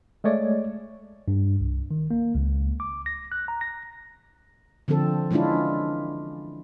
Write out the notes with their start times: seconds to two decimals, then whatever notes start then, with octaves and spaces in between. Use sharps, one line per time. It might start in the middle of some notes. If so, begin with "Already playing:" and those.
0.24 G#3 A3 C#5 D5
1.28 G2
1.60 C2
1.91 D#3
2.11 A#3
2.35 C#2
2.80 D6
3.06 A#6
3.32 F#6
3.48 A#5
3.61 A#6
4.88 D3 F3 C4 A4
5.31 E3 G#3 C#4 D4 E4 F4